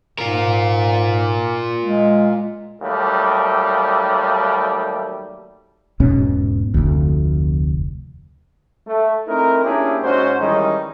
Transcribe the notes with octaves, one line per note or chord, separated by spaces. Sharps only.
G#2 F4 A#4
G#3
D#2 F#3 G3 A3
E1 G#2 B2 C#4
F1 D2
A3
A3 C4 D#4 E4 A#4
A#3 C#4 D4 E4 G4 G#4
G#2 C#4 F#4 C5
D#3 E3 G3 G#3 C#4 D#4